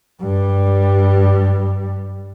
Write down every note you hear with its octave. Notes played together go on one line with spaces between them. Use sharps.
G2 G3